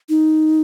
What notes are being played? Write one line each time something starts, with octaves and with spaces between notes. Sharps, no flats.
D#4